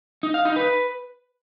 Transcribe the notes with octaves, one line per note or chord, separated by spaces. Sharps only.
D#4
F5
D#4
B4